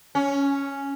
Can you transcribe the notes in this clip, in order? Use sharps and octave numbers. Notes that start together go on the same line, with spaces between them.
C#4